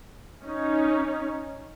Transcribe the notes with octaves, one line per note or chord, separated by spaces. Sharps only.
C#4 D#4